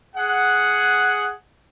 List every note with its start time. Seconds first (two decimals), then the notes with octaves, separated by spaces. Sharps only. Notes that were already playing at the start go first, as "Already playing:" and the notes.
0.15 G#4 F#5